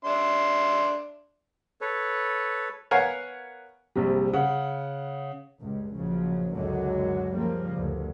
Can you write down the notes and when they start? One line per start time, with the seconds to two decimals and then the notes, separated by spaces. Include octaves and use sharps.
0.05 D4 E5 C6
1.81 A4 B4 C#5
2.91 B3 A#4 C#5 F5 F#5 G#5
3.95 A#1 C3 G3
4.33 C#3 F#5
5.61 C#2 G2
5.95 A#1 C#3 F3 F#3
6.53 C#2 F#2 D3 D#3 F#3 G#3
7.34 C#3 F3 G3 A#3
7.76 D2 G2